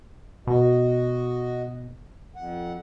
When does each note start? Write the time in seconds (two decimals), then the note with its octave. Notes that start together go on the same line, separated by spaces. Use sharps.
0.47 B2 F#4 D#5
2.36 F2 F#5